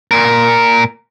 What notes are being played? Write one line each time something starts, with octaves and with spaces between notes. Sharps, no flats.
A#2 A#4